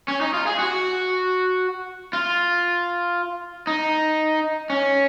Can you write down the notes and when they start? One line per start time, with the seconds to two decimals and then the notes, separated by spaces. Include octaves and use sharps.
0.08 C#4
0.21 D#4
0.34 F4
0.47 G#4
0.59 F#4
2.13 F4
3.67 D#4
4.70 C#4